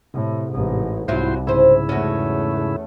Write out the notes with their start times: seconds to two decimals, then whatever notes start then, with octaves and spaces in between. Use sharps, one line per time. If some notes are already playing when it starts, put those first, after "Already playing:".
0.14 A2 C3
0.51 A1 G#2
1.08 C2 G#2 F#3 E4 F4 C5
1.47 G#2 C#3 C#4 E4 C5
1.89 E2 A3 C#4 F#4